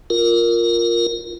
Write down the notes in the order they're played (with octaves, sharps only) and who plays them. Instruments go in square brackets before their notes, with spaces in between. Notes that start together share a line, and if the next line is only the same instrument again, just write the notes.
[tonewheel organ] F4 A#4